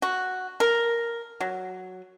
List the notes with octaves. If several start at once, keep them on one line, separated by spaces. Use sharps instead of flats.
F#4
A#4
F#3